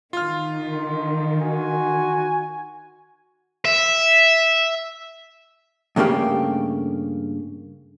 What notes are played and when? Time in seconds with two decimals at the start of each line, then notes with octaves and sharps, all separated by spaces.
0.13 D#3 F4 F6
1.42 F#4 G#5
3.65 E5
5.96 G2 C#3 A3 A#3 G4